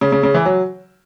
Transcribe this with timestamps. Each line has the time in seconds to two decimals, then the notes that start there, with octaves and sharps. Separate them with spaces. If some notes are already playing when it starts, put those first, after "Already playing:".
0.01 C#3
0.12 C#3
0.23 C#3
0.34 E3
0.45 F#3